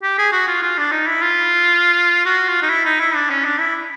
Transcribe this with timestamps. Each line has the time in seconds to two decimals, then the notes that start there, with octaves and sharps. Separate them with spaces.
0.03 G4
0.18 G#4
0.33 F#4
0.47 F4
0.62 F4
0.78 D4
0.92 D#4
1.07 E4
1.22 F4
2.26 F#4
2.48 F4
2.63 D#4
2.70 E4
2.85 D#4
3.00 E4
3.14 D4
3.30 C#4
3.45 D4
3.59 E4